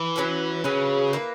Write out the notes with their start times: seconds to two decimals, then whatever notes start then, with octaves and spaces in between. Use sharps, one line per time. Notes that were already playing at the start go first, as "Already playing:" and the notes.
Already playing: E3
0.16 F#3 C#4 E4 B4
0.64 C#3 F#3 C#4 G#4 B4
1.13 A#3 E4 B4